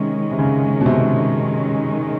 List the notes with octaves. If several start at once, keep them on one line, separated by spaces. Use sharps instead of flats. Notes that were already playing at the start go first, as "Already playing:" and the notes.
Already playing: C3 D#3 G#3 C#4
C3
C#3
B2
C3